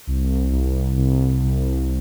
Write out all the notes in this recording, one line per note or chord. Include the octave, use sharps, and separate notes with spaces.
C2
C2
C2
C2